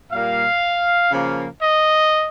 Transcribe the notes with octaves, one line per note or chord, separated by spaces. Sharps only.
A#2 G3 A#3 F5
C#3 F3 A#3
D#5